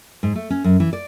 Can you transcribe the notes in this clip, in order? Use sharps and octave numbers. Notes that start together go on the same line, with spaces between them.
G#2
A3
C#4
F#2
E3
D5